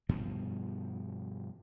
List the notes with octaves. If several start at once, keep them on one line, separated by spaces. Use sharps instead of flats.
G2 B2 D#3 F3